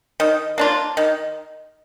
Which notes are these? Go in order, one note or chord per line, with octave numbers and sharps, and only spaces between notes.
D#3
A#3 D4 F4
D#3